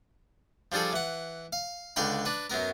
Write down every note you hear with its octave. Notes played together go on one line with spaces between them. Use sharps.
F3 G3 D4 G#4 A4
E3 F#5
F5
C#2 D3 F5 G5 B5
D4 B4
F#2 F#3 B3 A#4